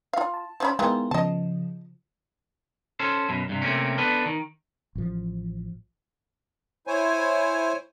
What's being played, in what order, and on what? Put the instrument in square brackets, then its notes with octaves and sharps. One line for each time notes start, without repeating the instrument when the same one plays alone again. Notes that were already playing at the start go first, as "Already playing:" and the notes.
[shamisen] F4 F5
[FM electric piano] A5
[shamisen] F3 C#4 B5
[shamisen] D#3 E3 F4 [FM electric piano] G#3 B3
[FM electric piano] C#3 F3 [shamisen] D#5 A5
[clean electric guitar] C#4 A4 C5
F#2 B2
G2 C3
C3 A3 A#3 C4 C#4
B3 D4 A4 B4
D#3
[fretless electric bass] A1 F3
[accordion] E4 C5 C#5 G#5